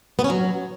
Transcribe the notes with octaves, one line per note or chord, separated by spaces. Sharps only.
B3
C#4
F#3